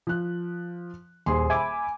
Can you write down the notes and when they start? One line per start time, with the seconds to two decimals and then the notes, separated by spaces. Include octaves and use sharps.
0.07 F3 F#6
1.26 D#1 D#2 G#4 C6
1.50 E5 G#5 B5 D6